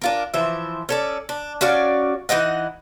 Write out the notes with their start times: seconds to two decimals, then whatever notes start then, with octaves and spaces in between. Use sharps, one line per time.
0.02 D4 F4 A#4
0.34 E3 F3 C5 E5
0.89 C#4 A4 D5
1.29 D4
1.61 C#4 F#4 D5 F5
2.29 E3 D#4 D#5 F#5